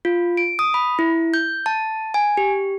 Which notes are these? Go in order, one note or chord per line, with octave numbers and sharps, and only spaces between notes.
F4
D7
D#6
B5
E4
G6
A5
G#5
G4